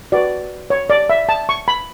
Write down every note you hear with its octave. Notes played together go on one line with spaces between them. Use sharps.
F#4 B4 D5
C#5
D5
E5
A5
C#6
B5